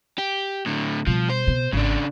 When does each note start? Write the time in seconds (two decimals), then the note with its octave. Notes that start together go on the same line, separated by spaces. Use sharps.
0.18 G4
0.66 A2 D3
1.07 B2 F3 G3
1.30 C5
1.47 B2
1.73 G#1 G#2 C#3 D4